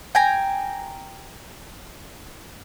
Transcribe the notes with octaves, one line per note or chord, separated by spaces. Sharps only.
G5 G#5 A#5